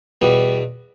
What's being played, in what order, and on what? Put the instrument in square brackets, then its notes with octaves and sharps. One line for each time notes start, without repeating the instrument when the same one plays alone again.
[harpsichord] E2 B2 G3 B3